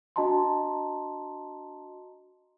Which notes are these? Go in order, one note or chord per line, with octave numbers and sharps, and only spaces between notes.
D4 F#4 D#5 A5 A#5 C6